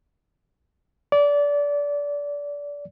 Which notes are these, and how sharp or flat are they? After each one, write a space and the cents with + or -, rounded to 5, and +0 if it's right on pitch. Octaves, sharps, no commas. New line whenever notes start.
D5 -25